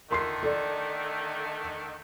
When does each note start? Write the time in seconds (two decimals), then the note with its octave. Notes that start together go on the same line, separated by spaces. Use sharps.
0.11 D3 D#3 A3 A#4 C6 C7
0.43 A4 D5